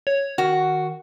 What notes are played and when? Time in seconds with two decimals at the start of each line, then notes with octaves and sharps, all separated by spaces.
0.07 C#5
0.38 D#3 F#4